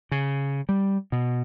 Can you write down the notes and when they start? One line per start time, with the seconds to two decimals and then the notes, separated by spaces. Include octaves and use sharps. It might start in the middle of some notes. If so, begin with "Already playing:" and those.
0.12 C#3
0.69 G3
1.12 B2